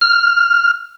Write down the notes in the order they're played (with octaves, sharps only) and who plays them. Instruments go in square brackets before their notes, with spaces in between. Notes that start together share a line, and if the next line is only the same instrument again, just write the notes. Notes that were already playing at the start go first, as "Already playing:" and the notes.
[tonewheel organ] F6